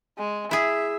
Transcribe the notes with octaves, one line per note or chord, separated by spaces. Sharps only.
G#3
E4 G#4 E5